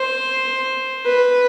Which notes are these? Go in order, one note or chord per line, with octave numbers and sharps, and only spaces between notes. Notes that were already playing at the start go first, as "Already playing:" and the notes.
Already playing: C5
B4